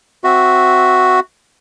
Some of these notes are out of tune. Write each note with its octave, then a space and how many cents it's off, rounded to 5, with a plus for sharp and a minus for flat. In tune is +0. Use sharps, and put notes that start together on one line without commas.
C4 +0 F#4 +0 E5 +0